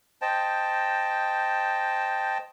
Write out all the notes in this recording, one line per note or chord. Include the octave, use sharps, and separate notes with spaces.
C5 D#5 G5 A5